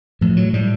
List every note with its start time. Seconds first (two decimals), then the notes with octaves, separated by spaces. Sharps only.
0.21 A2 F3
0.37 F#3
0.53 A2 G3